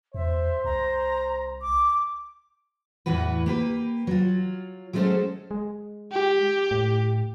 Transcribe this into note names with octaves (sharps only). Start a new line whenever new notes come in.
E2 C5 E5
C2 A#5
D6
E2 A2 E3 F#4 B4
A#3 G4 B4
F#3 F4
F#3 G#3 A3 C#4 A4 C5
G#3
G4
A2